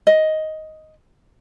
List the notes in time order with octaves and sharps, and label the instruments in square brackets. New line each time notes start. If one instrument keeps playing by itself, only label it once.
[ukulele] D#5